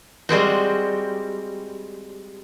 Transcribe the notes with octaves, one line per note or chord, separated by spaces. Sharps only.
G3 G#3 C4 F#4